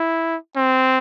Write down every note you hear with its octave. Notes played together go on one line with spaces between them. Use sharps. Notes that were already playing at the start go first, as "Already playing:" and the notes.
Already playing: E4
C4